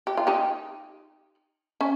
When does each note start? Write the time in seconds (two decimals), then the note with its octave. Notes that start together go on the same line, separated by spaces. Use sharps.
0.07 G4
0.17 F4
0.27 D#4 G4
1.81 C#4